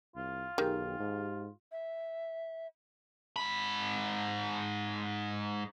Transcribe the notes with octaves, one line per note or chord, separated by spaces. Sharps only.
C2 F4
B1 D#3 G4 G#4
G#2
E5
G#2 B5